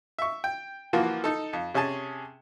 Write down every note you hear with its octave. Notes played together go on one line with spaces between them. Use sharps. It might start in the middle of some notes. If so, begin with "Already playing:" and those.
E5 C#6
G5
E3 F3 A#3 F4 F#4
D#4 A4
F2
C3 C#4 G#4 G#5 A5